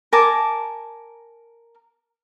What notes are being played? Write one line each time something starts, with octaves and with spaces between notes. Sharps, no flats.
A#4 G#5 A5 D6